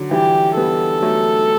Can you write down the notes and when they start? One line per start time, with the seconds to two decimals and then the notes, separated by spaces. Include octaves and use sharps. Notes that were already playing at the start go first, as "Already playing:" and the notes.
Already playing: D3 F#3
0.11 E3 G3 G4
0.57 G3 B3 A4
1.02 F#3 A3